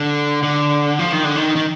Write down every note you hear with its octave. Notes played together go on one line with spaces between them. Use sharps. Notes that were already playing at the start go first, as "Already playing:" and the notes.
Already playing: D3
D3
F3
D#3
D3
D#3
D#3